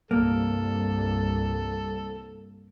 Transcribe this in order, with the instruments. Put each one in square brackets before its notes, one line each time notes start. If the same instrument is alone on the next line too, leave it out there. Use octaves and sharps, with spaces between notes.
[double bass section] C2 G2 [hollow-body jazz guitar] A#3 [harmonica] A4